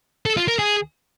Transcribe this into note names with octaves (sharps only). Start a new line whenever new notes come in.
A4
F4
A#4
G#4